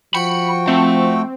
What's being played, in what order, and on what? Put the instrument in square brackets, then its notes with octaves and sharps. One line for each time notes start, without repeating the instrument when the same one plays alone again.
[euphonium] F3 [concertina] F#4 G5 [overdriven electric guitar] B5 [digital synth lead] C#7
[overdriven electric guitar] A3 [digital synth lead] C4